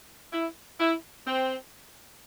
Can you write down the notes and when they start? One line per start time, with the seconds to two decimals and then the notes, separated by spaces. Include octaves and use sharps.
0.33 E4
0.80 E4
1.27 C4